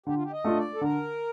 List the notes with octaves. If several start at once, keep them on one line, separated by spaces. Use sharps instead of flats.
D3 G4
F4
G4
D#5
A3 D4 F4
D5
A4
D3 A#4